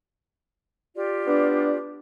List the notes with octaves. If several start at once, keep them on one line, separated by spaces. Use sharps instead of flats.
F4 G4 D5
B3 D4